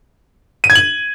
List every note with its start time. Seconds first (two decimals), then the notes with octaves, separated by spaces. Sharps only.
0.64 D#7
0.70 G#6
0.75 F#7